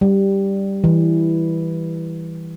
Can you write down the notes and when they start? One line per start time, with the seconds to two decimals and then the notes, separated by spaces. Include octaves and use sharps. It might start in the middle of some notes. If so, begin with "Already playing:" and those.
0.01 G3
0.84 E3